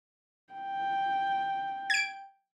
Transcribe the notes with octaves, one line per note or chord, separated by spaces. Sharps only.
G5
G#6 D7